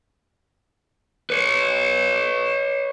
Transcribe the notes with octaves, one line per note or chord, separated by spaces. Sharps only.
B4 C#5